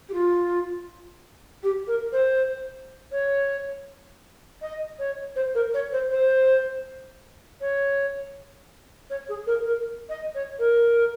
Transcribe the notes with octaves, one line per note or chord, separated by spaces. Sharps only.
G4
F4
G4
A#4
C5
C#5
D#5
C#5
C5
A#4
C#5
C5
C5
C#5
C#5
G#4
A#4
A#4
D#5
C#5
A#4